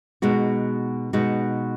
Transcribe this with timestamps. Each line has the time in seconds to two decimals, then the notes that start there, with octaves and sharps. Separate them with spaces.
0.22 B2 G#3 D#4 F#4
1.13 B2 G#3 D#4 F#4